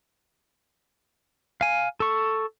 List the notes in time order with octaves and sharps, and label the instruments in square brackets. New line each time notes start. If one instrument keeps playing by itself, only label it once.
[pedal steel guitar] F5 G#5
A4 C#6